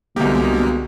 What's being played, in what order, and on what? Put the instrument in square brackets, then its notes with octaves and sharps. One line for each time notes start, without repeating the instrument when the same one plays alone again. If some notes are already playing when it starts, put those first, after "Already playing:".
[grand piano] C2 G4 [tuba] B2 [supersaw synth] D3 G#3 [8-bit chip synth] A#3